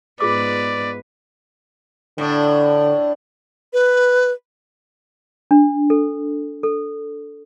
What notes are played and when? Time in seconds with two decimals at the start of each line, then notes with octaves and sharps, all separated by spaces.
0.20 G#2 B3 F4 G#4 B4 D5 D6
2.18 A2 D3 D4
3.73 B4
5.51 D4
5.90 A4
6.63 A4